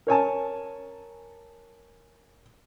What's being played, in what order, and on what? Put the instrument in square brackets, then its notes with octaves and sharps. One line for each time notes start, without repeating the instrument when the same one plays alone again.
[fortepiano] A#4 C#5 G#5 A5